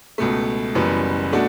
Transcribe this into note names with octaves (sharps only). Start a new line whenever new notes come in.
C#2 B2 A3
F#1 F#2 E3 G3 B3
B2 A3 D4 F#4